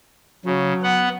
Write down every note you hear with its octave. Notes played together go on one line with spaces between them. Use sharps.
C#3 F#3
B3 F#5